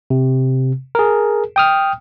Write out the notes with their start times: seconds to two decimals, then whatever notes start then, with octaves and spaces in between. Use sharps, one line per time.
0.10 C3
0.95 G#4 A#4
1.56 G5 D#6 F6